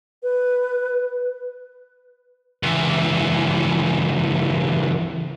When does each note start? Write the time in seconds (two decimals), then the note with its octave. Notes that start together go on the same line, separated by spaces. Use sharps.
0.23 B4
2.63 C#2 E3